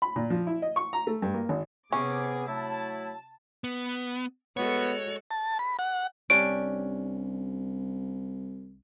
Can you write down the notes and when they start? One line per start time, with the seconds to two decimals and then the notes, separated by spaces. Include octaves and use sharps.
0.02 B5
0.16 A#2
0.30 F3
0.47 E4
0.62 D#5
0.76 C#6
0.93 A#5
1.07 A3
1.22 G2
1.34 A#3
1.49 G#1
1.92 C3 B3 C#4 G#4 D6
2.48 F#3 A3 E4 A5
3.64 B3
4.57 G#3 B3 F#4 A4 C#5
5.31 A5
5.59 B5
5.79 F#5
6.30 C2 C#4 D4 G4 D7